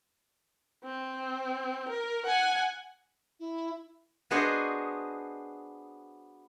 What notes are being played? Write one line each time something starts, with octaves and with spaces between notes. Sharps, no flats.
C4
A#4
F#5 G#5
E4
B3 D4 F#4 G#4 C5 D#5